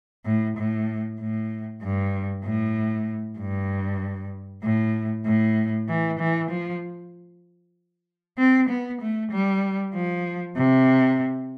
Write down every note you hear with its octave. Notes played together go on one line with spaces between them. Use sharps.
A2
A2
A2
G2
A2
G2
A2
A2
E3
E3
F3
C4
B3
A3
G3
F3
C3